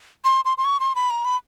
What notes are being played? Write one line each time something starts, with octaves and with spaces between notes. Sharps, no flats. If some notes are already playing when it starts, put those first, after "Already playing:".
C6
C6
C6
C#6
C6
B5
A#5
B5